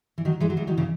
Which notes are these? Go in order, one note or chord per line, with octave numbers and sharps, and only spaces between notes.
E3
D#3 F#3
E3 G#3
F#3
E3 G#3
D#3 F#3
C#3 E3